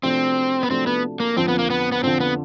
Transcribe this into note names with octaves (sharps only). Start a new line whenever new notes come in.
C3 F3 A3 C4 D4 F#4
B3
C3 F3 A3 C4 D4 F#4
B3
A#3
F2 D3 F3 C4
B3
A#3
B3
B3
F2 D3 F3 C4
B3